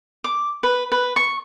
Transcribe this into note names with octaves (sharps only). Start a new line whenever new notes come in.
D6
B4
B4
C#6